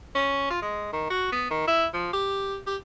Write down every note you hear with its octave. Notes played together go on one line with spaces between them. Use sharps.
C#4
F4
G#3
D#3
F#4
B3
D#3
E4
F3
G4
G4